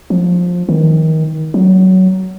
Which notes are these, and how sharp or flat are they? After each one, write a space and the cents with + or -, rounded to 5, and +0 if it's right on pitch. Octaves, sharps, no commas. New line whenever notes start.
F3 +20
D#3 +25
F#3 +15